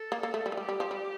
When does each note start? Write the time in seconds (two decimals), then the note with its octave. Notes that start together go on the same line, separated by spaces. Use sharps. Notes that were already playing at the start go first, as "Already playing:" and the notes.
Already playing: A4
0.12 A#3
0.23 A#3
0.34 A3
0.46 G3
0.52 F3
0.57 G3 G4
0.69 G3
0.80 F3
0.91 G3